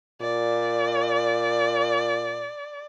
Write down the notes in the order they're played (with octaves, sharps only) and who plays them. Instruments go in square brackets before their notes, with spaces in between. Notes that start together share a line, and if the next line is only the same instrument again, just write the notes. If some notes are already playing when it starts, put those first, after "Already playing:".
[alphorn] A#2 [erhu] D5